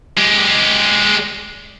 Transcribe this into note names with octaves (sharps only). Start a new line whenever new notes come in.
G#3 G4